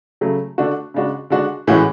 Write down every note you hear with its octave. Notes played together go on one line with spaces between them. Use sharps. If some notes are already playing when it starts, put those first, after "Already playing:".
C#3 F#3 A3
D3 A3 D4 F#4
C#3 G#3 D4 F#4
D3 G#3 D4 F#4
A2 E3 G#3 C#4 F#4